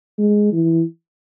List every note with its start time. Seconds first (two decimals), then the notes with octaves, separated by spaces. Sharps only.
0.18 G#3
0.52 E3